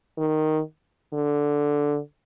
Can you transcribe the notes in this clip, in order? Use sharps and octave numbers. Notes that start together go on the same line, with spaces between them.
D#3
D3